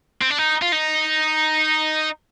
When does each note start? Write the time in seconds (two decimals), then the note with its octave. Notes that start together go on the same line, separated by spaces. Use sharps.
0.21 C4
0.30 D4
0.38 D#4
0.62 F4
0.72 D#4